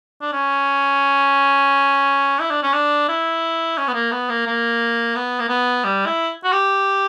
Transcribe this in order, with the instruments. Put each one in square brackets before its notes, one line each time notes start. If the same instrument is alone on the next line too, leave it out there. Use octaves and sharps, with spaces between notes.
[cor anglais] D4
C#4
E4
D4
C#4
D4
E4
C#4
B3
A#3
B3
A#3
A#3
B3
A#3
B3
G3
E4
F#4
G4